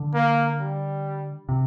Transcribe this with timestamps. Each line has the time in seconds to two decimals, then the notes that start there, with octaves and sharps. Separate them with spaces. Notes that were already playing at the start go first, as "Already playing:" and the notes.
Already playing: D3
0.14 A#3
0.60 G3
1.49 C3